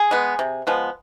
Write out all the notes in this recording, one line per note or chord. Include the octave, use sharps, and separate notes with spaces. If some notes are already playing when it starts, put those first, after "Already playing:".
Already playing: G#4
G#3 B3
C3
F3 G#3 B3